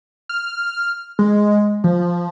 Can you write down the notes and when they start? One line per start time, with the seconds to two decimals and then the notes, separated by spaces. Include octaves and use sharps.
0.29 F6
1.19 G#3
1.84 F3